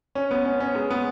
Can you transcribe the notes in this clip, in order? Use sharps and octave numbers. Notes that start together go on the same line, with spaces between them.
C#4
B3
C#4
C#4
G#3
B3